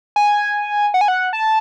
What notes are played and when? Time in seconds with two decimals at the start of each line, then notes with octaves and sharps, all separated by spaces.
0.16 G#5
0.94 F#5
1.01 G#5
1.08 F#5
1.33 A5